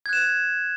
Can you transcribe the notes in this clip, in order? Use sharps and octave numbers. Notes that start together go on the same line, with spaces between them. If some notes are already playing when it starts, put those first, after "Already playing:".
F#6 G#6 E7